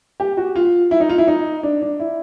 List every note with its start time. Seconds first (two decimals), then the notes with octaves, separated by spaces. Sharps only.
0.20 G4
0.37 F#4
0.56 F4
0.91 E4
1.00 D#4
1.09 F4
1.18 E4
1.27 D#4
1.63 D4
1.82 D4
2.00 E4